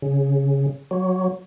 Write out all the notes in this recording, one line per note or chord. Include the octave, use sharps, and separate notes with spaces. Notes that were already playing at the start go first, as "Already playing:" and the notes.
C#3
F#3